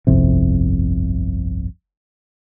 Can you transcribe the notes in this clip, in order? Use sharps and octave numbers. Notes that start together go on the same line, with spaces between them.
G1 C2 F2 C3